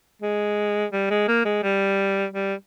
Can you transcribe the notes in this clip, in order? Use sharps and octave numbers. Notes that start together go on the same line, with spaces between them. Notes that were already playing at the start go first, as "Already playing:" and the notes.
G#3
G3
G#3
A#3
G#3
G3
G3